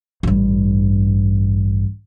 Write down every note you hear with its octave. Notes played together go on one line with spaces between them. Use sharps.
A1 G2